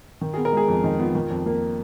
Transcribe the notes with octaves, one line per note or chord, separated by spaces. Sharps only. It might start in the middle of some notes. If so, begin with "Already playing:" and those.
D#3
G#4
B3
A#4
G#3 G#4
F2
D#3 D#4
B3 F4
D#3
F2
A#3